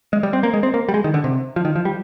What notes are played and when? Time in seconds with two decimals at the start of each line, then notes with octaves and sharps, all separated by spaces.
0.13 G#3
0.23 G3
0.33 C4
0.43 A#3
0.54 G#3
0.63 C4
0.74 A#3
0.89 G3
0.94 G#3
1.04 D#3
1.14 D3
1.24 C3
1.56 F3
1.65 D#3
1.76 F3
1.85 G3